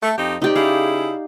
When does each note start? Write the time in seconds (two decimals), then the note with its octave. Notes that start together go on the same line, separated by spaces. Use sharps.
0.03 A3
0.18 F2 D#4 G4
0.42 C3 D#4 G4 D5
0.56 C#3 E4 G#4 F5